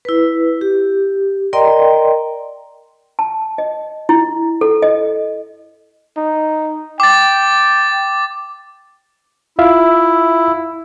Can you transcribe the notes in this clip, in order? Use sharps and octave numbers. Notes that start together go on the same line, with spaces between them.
E4 B4
G4
A#4 D5 D#5 G5 A#5 C6
A5
D#5
E4
A4
D#5
D#4
G5 D6 A6
E4 F4 E5 F5